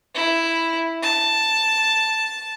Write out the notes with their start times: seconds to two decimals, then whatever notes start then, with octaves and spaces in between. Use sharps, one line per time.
0.15 E4
1.02 A5